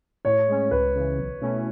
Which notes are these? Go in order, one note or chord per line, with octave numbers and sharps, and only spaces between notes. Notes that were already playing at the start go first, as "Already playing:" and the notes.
A2 C#5
G#3 C#4
C#2 B4
C#3 E3
B1
B2 A3 C#4 E4